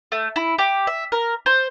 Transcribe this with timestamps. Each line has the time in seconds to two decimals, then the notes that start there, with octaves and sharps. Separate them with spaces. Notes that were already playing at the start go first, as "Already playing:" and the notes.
0.12 A3
0.36 E4
0.58 G4
0.87 E5
1.12 A#4
1.46 C5